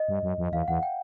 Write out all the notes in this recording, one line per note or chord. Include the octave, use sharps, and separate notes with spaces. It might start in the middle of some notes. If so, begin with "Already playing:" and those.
Already playing: D#5
G2
F#2
F2
E2 F5
E2 F#5
G5